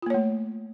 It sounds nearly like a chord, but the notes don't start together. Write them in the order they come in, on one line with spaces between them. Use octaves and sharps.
F4 A#3 C#5 A3